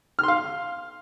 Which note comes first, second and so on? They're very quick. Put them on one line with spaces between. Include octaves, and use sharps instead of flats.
F6 C6 F5